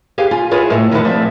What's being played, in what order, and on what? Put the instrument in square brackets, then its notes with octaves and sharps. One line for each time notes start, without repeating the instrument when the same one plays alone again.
[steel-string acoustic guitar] G4 G#4 F5
F4 G#5
E4 F4 G#4 B4 C#5
A2 G#3 A3
E2 D#3 F3 A#4 B4 F#5
F3 C4 D5 E5